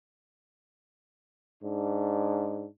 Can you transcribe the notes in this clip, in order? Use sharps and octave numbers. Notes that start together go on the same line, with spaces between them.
G#2 D4